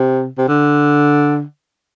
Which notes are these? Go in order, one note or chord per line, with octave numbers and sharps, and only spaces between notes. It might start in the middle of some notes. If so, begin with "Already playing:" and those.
Already playing: C3
C3
D3